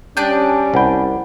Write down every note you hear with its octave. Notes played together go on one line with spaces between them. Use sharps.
G3 C#4 D4 G4 D#6 G6
C2 C5 F#5 G5 B5